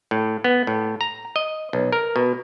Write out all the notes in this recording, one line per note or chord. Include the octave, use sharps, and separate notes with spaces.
A2
B3
A2
A#5
D#5
B1
A#4
B2